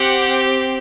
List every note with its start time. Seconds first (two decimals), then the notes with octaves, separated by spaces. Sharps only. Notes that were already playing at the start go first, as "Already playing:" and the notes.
Already playing: C4 G4 F#5